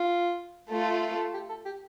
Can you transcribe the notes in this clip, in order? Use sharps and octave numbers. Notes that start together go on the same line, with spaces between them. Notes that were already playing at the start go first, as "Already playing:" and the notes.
Already playing: F4
A3 F4 A4
G4
A4
G4